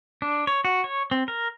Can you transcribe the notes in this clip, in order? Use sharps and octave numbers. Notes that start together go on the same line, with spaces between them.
D4
C#5
F#4
C#5
C4
A#4